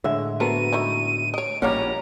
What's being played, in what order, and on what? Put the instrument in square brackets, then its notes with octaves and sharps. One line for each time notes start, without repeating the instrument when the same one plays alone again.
[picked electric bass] A2 D3 G#3 [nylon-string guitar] E5
[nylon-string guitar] B3 F#4 [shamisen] A4 A#4 C5 [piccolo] D#7
[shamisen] A3 D#4 E4
[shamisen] C#5 D#5 [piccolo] D7
[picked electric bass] A#1 A#2 G3 [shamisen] A#3 D#4 F#5 [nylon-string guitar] C#4 [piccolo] A#5